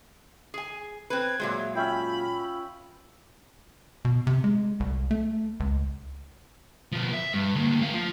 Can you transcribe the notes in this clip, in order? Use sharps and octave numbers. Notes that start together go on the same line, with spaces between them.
G#4 G#5
C4 B4 G#6
A#2 F#3 G#3 E5
C#4 F4 E5 G5 B5
B2
C3
G#3
C2
A3
C#2
B2 F3
E5
G2
D2 A#3
A3 F5
F3